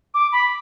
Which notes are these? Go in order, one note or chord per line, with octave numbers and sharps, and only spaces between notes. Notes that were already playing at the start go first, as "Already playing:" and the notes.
D6
B5